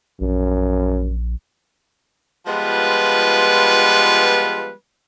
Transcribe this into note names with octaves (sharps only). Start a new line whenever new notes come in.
A#1 F#2
F3 G3 G#3 B3 F4 B4